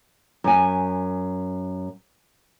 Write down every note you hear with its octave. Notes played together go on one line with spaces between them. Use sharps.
F#2 G#5